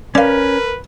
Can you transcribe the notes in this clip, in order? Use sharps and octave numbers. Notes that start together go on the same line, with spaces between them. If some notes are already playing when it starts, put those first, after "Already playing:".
C#4 A#4 B4 D5 F5